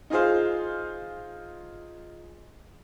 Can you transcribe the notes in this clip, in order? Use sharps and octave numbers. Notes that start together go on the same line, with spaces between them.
D#4 F4 G#4 C5 F5